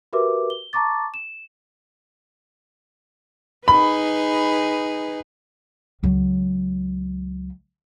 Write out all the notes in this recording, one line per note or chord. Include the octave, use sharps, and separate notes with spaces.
F#4 G4 A#4 B4 E5 D6
G7
A5 A#5 C#6 D6 A6
E7
D#4 G#4 B4 B5
C#2 F#3